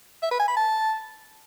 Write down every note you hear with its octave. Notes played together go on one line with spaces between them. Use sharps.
E5
B4
G#5
B5
A5